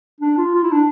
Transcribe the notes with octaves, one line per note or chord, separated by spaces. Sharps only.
D4
F4
F4
E4
D4